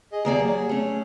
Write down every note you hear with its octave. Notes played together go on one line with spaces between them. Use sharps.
G#4 D#5
D#2 A#3 G#4 D5
F#3
A3 C#4